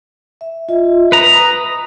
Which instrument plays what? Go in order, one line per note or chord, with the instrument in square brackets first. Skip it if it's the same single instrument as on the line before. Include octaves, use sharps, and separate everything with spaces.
[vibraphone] E5
F4 D#5 E5
[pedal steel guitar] B4 A#5 [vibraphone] D#6